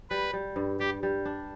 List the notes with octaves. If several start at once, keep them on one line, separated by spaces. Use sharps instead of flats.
G3 B4
G3
G2
G3 G4
G3
D4